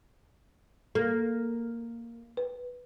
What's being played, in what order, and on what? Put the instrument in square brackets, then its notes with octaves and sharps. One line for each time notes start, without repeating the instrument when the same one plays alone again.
[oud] A#3 [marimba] A4
[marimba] B4